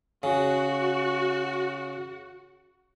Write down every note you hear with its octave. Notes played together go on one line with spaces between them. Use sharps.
C#3 F#4